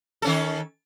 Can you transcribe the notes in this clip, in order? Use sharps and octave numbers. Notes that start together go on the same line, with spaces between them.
D#3 C#4 A4